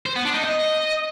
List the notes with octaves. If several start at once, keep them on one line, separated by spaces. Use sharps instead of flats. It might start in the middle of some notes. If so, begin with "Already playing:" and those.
C5
B3
D4
D#4
D#5